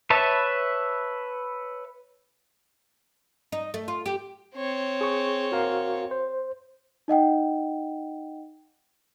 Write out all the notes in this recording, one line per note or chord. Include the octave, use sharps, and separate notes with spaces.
B4 C#5 E5 A5
D#4
A3
F4
G4
C4 C#5
G#4 C#6
F#4 A#4 F5
C5
D#4 D#5 F#5 G5